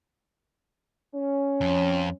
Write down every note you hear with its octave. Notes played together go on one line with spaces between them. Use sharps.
C#4
F2